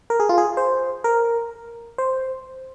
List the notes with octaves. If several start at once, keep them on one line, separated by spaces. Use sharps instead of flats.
A#4
G#4
F4
G#4
C5
A#4
C5